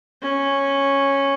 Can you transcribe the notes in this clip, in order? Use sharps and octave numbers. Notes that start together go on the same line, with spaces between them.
C#4